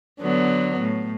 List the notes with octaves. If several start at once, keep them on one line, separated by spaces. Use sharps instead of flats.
D3 F#3 B3
A2